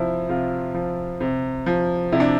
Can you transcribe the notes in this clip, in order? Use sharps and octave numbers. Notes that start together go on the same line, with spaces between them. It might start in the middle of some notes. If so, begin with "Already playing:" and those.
Already playing: C3 F3 E4
C3 F4
F3
C3
F3
C3 E4
D4